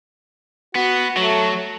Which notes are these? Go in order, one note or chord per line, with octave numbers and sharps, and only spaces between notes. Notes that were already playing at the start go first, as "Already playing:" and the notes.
B3 F#4
F#3 A3